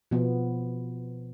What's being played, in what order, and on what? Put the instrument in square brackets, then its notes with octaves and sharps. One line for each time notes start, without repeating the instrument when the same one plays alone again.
[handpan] B2 F3 B3